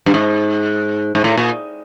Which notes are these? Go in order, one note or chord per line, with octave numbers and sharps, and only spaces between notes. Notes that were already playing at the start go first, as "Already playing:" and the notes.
G2
G#2
G#2
A2
A#2